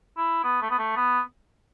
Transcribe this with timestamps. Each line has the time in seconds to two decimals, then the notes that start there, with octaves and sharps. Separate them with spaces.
0.17 E4
0.44 B3
0.62 A3
0.70 B3
0.78 A3
0.96 B3